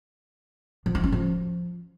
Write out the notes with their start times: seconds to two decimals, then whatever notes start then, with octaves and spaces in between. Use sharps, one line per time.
0.86 F3
0.95 D#4
1.04 C#4
1.12 F3